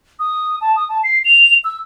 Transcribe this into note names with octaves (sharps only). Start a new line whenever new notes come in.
D#6
A5
D#6
A5
C7
F7
E6